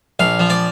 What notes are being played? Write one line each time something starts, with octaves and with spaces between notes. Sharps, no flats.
A#1 F5
F3
D5